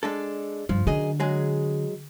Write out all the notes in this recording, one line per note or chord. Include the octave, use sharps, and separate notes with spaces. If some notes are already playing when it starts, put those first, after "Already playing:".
G#3 D4 A4
G2 F3
F#2 D3 G#4 D#5
F#3 G#3 G#4